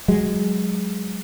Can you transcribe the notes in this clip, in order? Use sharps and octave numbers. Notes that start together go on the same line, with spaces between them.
F#3 G#3